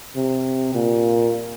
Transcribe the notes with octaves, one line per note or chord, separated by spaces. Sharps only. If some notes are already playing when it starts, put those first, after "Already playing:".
C3
A#2